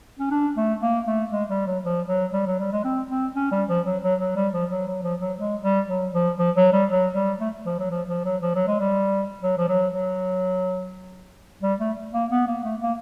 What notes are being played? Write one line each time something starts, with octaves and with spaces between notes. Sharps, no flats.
C#4
D4
A3
A#3
A3
G#3
G3
F#3
F3
F#3
G3
F#3
G3
G#3
C4
C4
C#4
G3
F3
F#3
F#3
F#3
G3
F3
F#3
F#3
F3
F#3
G#3
G3
F#3
F3
F3
F#3
G3
F#3
G3
A3
F3
F#3
F3
F3
F#3
F3
F#3
G#3
G3
F#3
F3
F#3
F#3
G3
A3
A#3
B3
A#3
A3
A#3